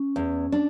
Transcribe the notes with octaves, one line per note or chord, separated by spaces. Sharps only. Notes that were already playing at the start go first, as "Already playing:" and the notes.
Already playing: C#4
E2
D4